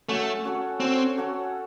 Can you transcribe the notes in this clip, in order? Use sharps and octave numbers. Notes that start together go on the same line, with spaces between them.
A3 C#4 F#4 A4 C#5
C#4 F#4 A4 C#5
C4 C#4 F#4 A4
C#4 F#4 A4